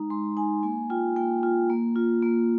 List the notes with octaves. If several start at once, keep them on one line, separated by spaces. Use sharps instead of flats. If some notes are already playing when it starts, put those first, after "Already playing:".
Already playing: G#3 D#4 A#5
G#3 C6
D#4 G#5
A#3 G#5
F4 G5
A#3 G5
F4
A#3
F4
A#3